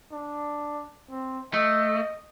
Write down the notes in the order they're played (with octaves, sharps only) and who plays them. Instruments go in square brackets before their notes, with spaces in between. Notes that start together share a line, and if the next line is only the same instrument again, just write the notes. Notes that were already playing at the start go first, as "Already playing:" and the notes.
[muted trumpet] D4
C4
[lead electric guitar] A3 [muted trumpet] D#5